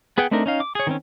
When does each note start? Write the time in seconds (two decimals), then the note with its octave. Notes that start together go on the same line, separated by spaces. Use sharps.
0.18 B3 G#4 B4 F#5 G5
0.31 A3 C4 D4 D#4 A#4
0.46 C#4 D#4 F5
0.60 D6
0.75 G#4 C#5
0.87 D#3 C4 C#4